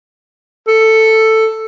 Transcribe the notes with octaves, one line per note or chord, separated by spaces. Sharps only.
A4